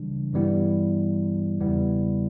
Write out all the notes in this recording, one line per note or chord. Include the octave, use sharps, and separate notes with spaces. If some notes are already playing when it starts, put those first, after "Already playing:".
Already playing: C#3 E3 G3 D4
G2 E3 G3 B3 E4
E2 C#3 G3 B3 E4